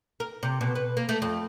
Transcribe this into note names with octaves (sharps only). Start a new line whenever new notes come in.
A#4
C3
B2
B4
A#3
A3
F2